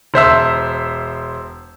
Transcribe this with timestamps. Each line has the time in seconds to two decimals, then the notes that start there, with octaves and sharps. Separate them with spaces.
0.14 E1 C5 E5 E6